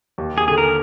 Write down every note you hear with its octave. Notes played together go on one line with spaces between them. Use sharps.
D#2
G#4
D3 G#4
A#4